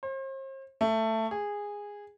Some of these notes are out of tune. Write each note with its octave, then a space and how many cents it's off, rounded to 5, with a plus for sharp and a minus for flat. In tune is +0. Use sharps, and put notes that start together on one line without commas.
C5 +40
A3 +15
G#4 -15